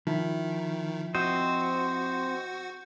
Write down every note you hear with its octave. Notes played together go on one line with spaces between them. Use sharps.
D#3 F3 E4
C4 F#4 C5 D#5 G6